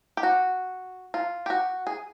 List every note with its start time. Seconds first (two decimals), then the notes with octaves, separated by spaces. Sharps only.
0.17 G4
0.23 F#4
1.14 F4
1.46 G4
1.50 F#4
1.87 G#4